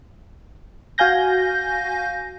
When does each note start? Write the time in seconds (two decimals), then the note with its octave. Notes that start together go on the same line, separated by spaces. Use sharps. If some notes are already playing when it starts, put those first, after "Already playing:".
0.98 F#4 F5 G#5 G6 A#6